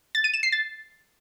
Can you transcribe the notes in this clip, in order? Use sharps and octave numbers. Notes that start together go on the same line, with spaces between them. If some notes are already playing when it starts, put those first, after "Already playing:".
A6
D#7
E7
C7
A6